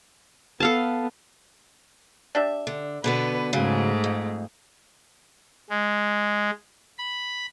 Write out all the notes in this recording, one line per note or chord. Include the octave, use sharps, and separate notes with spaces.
B3 A4 F5 A5
D4 G4 E5
D3
B2 D3 B3 B4
G#2 C#3 F#3 G#3 A3
F2
G#3
B5